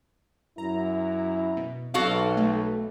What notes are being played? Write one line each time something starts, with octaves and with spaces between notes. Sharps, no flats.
F#2 E4 A#5
B2
B1 F#4 A4 F5 D6
A3